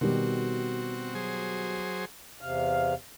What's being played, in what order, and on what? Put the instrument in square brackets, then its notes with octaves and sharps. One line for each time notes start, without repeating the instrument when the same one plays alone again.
[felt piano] B2 D#3 G3 [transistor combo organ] C4 F#4
[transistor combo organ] F#3 G#4 C5
[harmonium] E2 C3 F5